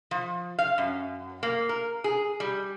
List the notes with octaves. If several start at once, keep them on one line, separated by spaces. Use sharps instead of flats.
F3
F5
F#2
A#3
A#4
G#4
G3